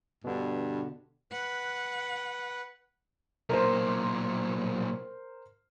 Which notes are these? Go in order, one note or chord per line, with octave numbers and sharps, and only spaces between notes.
G2 B2 D3
B4 F#5
B1 A#2 A#4 C5